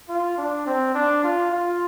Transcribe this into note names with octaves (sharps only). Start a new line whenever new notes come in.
F4
D4
C4
D4
F4
F4